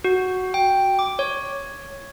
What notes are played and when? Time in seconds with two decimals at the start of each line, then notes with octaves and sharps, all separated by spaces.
0.04 F#4
0.54 G5
0.99 D6
1.19 C#5